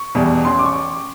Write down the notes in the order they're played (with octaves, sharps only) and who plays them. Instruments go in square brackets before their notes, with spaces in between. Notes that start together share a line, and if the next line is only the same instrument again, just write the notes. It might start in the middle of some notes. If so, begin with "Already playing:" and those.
Already playing: [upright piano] C#6
E2 B2 G3
A1 C6
D6
C#6